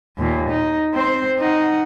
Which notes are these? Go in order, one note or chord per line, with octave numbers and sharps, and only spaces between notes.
D#2 A#2
D#4
C4 C5
D#4 F#5